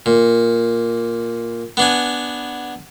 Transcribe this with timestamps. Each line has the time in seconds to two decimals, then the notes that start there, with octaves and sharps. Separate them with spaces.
0.06 A#2
1.77 B3 D4 G#5